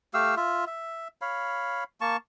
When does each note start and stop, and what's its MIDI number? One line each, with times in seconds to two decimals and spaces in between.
0.14 0.35 57
0.14 0.35 67
0.14 0.35 77
0.14 0.35 88
0.37 0.65 65
0.37 0.65 76
0.67 1.08 76
1.21 1.84 73
1.21 1.84 77
1.21 1.84 83
2.01 2.17 58
2.01 2.17 81
2.01 2.17 85